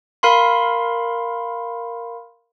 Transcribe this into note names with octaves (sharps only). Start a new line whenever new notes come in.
A#4 F5 B5 C6